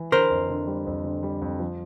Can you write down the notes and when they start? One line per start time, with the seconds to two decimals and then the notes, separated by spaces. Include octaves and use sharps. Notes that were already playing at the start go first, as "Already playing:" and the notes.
Already playing: E3
0.12 D3 A#4 C5
0.31 F2
0.49 D3
0.67 G3
0.86 F2
1.04 D3
1.23 G3
1.42 F2
1.59 F3